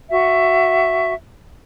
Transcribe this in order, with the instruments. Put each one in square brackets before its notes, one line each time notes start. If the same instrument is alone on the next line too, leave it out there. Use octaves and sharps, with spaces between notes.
[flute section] F#4 E5